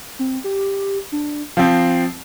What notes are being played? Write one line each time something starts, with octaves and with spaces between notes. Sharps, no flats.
C4
G4
D4
F3 C4 C7